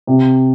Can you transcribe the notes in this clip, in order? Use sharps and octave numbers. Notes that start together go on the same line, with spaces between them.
C3